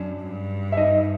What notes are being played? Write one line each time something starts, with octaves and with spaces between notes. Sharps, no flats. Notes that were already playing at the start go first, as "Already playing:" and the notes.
Already playing: F#2 D4
G2
E5
D#4 D#5